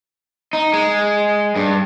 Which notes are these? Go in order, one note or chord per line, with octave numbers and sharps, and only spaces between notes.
D#4
G#3
G2